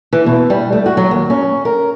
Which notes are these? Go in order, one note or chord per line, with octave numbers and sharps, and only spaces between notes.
E3
B2
G3
A3
F#4
F#3
D#2
C#4
A#4